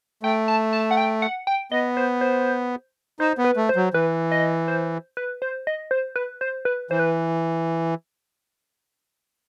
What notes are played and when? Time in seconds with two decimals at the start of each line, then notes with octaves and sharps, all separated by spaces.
0.23 A3 G5
0.48 A5
0.73 A5
0.91 F#5
0.97 G5
1.22 F#5
1.47 G5
1.72 B3 D#5
1.97 C5
2.21 C5
3.20 D#4 C5
3.38 B3
3.44 B4
3.57 A3
3.69 C5
3.76 F#3
3.94 E3 B4
4.31 D#5
4.68 C5
5.17 B4
5.42 C5
5.67 D#5
5.91 C5
6.16 B4
6.41 C5
6.65 B4
6.91 E3 C5
6.99 B4